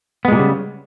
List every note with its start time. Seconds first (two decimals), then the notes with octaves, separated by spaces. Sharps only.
0.25 B3
0.28 G#3
0.32 A#2
0.35 G3
0.39 C#3